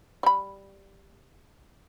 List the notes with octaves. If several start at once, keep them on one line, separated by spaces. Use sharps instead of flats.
G3 B5